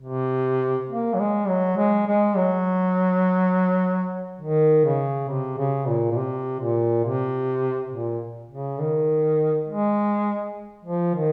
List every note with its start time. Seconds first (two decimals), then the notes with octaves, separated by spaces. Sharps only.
0.02 C3
0.90 A#3
1.14 F#3
1.19 G#3
1.48 F#3
1.77 G#3
2.07 G#3
2.36 F#3
4.41 D#3
4.85 C#3
5.29 C3
5.58 C#3
5.88 A#2
6.12 A#2
6.16 C3
6.60 A#2
7.04 C3
7.92 A#2
8.51 C#3
8.80 D#3
9.68 G#3
10.85 F3
11.15 D#3